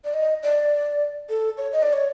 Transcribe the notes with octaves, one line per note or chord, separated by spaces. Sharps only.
D5
D#5
D5
A4
C#5
D#5
D5
C#5